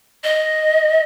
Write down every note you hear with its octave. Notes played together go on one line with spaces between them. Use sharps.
D#5